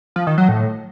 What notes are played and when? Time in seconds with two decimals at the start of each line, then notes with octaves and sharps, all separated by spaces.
0.16 F3
0.27 D#3
0.38 F#3
0.49 A2